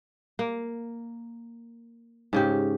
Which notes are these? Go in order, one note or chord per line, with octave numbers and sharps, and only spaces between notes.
A#3
G#2 C#3 G4